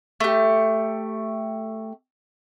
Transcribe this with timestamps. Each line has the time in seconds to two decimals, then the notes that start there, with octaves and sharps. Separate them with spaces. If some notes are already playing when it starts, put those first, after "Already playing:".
0.20 A3 G4